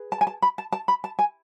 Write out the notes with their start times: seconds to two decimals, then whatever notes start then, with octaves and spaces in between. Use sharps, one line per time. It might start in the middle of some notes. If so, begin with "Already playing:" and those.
Already playing: G#4 B4
0.12 A5
0.21 G#5
0.27 A5
0.42 B5
0.58 A5
0.72 A5
0.88 B5
1.04 A5
1.19 G#5